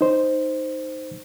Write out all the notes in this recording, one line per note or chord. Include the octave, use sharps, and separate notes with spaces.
D#4 C5